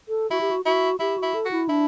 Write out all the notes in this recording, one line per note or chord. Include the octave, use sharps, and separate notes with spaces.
A4
E4 F#4
G4
F#4
E4 F#4
E4 G4
E4 F#4
A4
F#4
E4
D4 E4